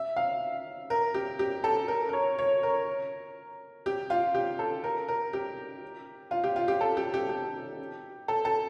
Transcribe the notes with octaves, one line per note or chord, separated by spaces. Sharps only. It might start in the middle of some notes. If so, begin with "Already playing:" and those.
Already playing: E5
F5
A#4
G4
G4
A4
A#4
A#4
C#5
C#5
A#4
G4
F4
G4
A4
A#4
A#4
G4
F4
G4
F4
G4
A4
G4
G4
G4
A4
A4